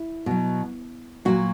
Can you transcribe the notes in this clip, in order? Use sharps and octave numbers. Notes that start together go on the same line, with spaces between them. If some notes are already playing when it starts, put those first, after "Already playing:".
Already playing: E4
B2 F#3
A#2 F#3 F#4